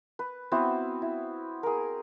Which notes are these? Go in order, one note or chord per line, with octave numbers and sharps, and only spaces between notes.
B4
B3 C4 E4 F#4
E4
G#4 A#4